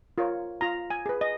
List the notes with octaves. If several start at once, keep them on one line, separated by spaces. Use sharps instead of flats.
F4 A#4 C#5
F4 A#5
G#5
G#4 B4
D#5